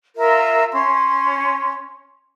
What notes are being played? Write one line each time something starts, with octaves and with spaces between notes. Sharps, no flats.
F4 A#4 E5
C#4 C6